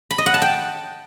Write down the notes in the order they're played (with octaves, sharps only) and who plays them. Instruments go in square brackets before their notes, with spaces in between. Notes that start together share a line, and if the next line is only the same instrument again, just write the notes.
[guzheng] B5
D#5
F#5
A5
G5